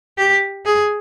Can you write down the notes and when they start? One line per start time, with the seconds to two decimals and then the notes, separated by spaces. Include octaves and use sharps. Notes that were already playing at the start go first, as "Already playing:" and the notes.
0.18 G4
0.65 G#4